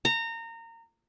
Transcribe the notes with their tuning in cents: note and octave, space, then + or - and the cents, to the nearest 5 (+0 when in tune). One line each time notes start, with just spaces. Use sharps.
A#5 -25